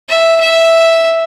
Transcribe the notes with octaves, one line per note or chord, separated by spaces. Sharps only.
E5
E5